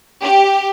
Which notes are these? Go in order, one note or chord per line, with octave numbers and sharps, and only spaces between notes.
G4